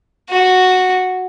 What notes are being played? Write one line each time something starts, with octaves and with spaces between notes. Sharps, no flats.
F#4